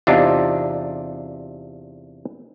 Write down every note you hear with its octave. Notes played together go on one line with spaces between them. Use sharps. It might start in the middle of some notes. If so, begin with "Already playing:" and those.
E2 C3 D4 D#4 F4 G4